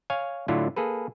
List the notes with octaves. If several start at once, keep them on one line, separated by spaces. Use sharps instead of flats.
C#5 F5 G#5
A2 D3 F#3 E4 F4
A#3 G#4 A4 B4